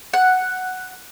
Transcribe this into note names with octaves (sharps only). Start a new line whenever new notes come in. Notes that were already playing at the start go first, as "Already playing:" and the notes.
F#5